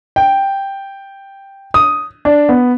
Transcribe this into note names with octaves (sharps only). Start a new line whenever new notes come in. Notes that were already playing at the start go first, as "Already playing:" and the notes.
G5
D#6
D4
B3